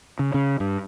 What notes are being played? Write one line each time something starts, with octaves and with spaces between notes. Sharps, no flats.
C#3
C#3
G2